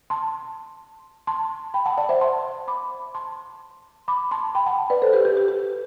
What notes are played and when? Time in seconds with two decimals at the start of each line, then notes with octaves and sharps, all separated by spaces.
0.10 A5 C6
1.27 A5 C6
1.74 G5 B5
1.85 F#5 A5
1.97 D5 F#5
2.09 C5 E5
2.21 A5 C6
2.68 B5 D6
3.14 A5 C6
4.08 B5 D6
4.31 A5 C6
4.55 G5 B5
4.66 F#5 A5
4.90 B4 D5
5.02 A4 C5
5.13 G4 B4
5.25 G4
5.37 G4
5.48 G4